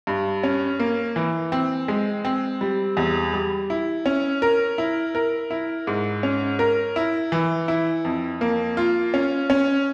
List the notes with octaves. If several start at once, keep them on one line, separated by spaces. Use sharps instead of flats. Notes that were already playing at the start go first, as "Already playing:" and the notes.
G2
C#4
A#3
E3
C4
G#3
C4
G3
E2
G3
E4
C#4
A#4
E4
A#4
E4
G#2
C#4
A#4
E4
E3
E4
F2
A#3
F4
C#4
C#4